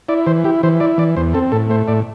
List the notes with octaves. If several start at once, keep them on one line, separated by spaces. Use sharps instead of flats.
E4 D5
E3 C5
E4 G4
E3 C5
E4 D5
E3 D5
E2 C5
C4 A4
A2 A4
A3 C5
A2 D5